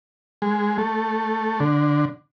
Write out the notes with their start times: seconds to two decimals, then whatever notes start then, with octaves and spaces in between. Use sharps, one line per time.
0.42 G#3
0.78 A3
1.60 D3